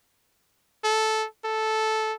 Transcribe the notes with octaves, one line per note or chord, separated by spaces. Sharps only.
A4
A4